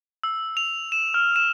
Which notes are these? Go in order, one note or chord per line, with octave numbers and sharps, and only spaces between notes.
E6
F7
E7
F6
E7